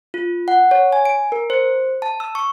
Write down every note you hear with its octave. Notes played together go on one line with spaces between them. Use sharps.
F4
F#5
C#5
G#5
D7
A#4
C5
A5
E6
C#6